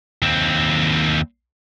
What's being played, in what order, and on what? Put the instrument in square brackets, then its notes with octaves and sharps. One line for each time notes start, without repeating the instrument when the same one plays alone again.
[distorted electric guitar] D#2 C4